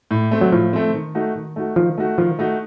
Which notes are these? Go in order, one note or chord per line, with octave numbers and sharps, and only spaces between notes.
A2
A3 C4
F#3
A2 F3
A3 C4
D#3
A3 D#4 F#4
D#3
A3 D#4 F#4
D#3 F3
A3 D#4 F#4
D#3 F3
A3 D#4 F#4